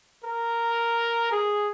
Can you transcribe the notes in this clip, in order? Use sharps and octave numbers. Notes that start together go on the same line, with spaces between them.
A#4
G#4